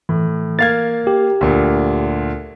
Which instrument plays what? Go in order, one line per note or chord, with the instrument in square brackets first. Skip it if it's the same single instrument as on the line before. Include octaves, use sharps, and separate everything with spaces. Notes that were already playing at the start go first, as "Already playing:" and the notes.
[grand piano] A2 [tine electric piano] E3
[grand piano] A#3 F5 G#6 [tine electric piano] A6
[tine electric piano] G4
[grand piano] D2 A#2